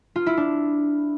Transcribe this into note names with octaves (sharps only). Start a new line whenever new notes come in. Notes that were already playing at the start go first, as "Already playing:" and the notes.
F4
E4
D4